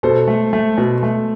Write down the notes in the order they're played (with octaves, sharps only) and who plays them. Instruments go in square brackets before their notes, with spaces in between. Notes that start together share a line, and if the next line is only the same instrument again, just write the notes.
[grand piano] B2 [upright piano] A4 C5
[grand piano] A3
A3
B2
A3